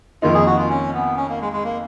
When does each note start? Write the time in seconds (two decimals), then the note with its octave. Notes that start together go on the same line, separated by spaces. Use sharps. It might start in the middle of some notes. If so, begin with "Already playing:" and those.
0.22 F2 D#3 A#3 D#4 F4
0.34 G#4
0.46 F#4
0.58 F4
0.69 C#4
0.93 B3
1.16 C#4
1.29 A#3
1.41 G#3
1.53 G#3
1.64 A#3